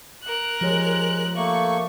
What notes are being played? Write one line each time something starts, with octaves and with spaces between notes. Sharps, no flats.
A#4 F#6
F3 G#3 G4 C#5
A3 A#3 C#6